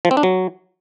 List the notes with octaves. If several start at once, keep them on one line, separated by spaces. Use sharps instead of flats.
F3
C4
D4
F#3